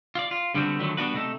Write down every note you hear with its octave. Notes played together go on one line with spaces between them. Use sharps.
F4 D5
F4
G2 D3 G3 B3 C4 F#4
D3 D#3 F3 F#3 A3
G3 B3 C4 D4 F#4 B4
C3 A3 D#4 A4